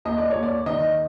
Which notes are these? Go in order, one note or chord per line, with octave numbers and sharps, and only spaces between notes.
D#2 D#5
D5
C#5
D#2
D5
D#3 D#5